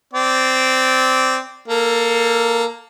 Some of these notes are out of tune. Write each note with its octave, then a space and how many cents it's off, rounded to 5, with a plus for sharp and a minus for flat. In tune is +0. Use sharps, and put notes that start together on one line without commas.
C4 -10 D5 -10
A#3 +0 A4 +20